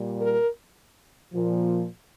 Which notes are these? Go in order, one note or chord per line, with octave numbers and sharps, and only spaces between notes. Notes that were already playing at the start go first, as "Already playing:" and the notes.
Already playing: A#2 G3
A#4
A#2 F3